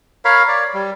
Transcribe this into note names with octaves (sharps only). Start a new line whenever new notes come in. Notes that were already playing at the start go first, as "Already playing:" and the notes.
A#4 C#5 F5 B5
C#5 D5
G3